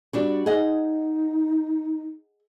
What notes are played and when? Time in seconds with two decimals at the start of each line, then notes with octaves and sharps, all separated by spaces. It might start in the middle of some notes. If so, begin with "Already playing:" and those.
0.13 G3 D4 F#4
0.46 D#4 G#4 D#5 F#5